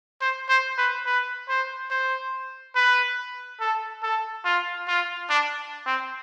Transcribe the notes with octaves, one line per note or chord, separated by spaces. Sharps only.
C5
C5
B4
B4
C5
C5
B4
A4
A4
F4
F4
D4
C4